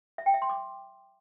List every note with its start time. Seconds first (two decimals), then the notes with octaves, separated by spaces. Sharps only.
0.18 E5
0.26 G5
0.34 E5
0.42 C6
0.50 D6